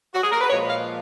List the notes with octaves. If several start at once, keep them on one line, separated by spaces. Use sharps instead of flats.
F#4
G#4
A#4
B4
A#2 F3 G#3 C#5
F5